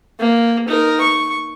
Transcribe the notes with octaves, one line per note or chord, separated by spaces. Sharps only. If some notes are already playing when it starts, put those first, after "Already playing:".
A#3
D#4 A#4
C#6